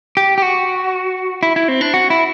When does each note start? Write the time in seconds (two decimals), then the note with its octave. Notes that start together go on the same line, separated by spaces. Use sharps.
0.17 G4
0.38 G4
0.42 F#4
1.43 E4
1.56 E4
1.68 C4
1.81 D4
1.94 F#4
2.10 E4